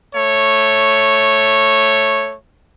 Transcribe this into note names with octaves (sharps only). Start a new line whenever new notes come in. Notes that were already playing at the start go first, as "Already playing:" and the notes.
A3 C#5